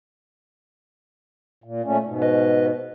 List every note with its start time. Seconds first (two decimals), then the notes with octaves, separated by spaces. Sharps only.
1.64 A#2
1.84 A#2 A3 C#4
2.04 G#2 B2
2.22 B4 D#5